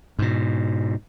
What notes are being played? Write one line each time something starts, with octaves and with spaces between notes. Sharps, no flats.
G#2 B2